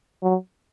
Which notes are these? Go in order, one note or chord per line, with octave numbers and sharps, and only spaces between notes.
F#3